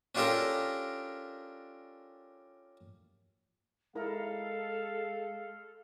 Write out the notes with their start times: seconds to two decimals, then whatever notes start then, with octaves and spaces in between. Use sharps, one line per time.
0.15 C#4 D4 F4 G4 A4 A#4
3.95 G#3 E4 A4 A#4 F5 A#5